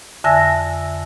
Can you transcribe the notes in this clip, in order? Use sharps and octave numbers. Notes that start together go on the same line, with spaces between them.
F2 D3 E5 G#5 E6 A#6